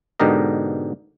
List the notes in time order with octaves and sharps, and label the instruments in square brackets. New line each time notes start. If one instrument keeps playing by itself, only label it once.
[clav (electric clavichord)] G#2 B2 D3 G4 A#4 D#5